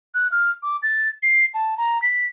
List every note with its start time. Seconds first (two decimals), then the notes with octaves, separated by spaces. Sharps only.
0.15 F#6
0.32 F6
0.63 D6
0.83 A6
1.23 C7
1.54 A5
1.78 A#5
2.02 B6